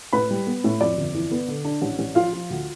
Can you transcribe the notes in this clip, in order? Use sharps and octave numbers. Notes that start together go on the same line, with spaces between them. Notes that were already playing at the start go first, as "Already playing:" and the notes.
A2 B4 B5
G3
B3
A2
F2 D5
G1
E3
B3
D3
D4
A1
A1
F3 F4 F5
F3
D2